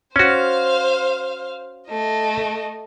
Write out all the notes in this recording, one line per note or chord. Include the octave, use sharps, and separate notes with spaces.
C#4 F#4 C5 F5
A3 D#5